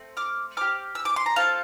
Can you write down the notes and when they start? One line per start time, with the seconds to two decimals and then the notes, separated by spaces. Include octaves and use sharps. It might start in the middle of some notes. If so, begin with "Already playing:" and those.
Already playing: A3 C4
0.17 D6 F6
0.57 C4 G4 D6 F6
0.95 E6
1.05 D6
1.16 C6
1.26 A#5
1.36 C4 F4 A4 F5 A5